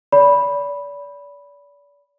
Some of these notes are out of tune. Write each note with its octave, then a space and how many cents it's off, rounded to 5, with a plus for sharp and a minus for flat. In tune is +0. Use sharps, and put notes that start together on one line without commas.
D5 -35 B5 -5